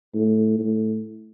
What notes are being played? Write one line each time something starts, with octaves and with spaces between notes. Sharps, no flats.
A2
A2